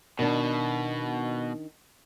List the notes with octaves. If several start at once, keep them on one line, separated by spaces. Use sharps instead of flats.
B2 D#3 D4